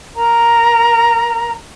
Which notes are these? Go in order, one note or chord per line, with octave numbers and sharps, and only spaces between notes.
A#4 A#5